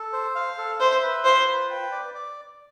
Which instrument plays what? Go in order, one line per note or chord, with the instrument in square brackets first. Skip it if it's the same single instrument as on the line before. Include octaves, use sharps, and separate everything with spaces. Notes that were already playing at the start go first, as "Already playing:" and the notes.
Already playing: [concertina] A4
C5
F5
A4
[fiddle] C5 [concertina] E5
[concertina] B4
[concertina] F4 [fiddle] C5
[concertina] B4
G5
D5
D5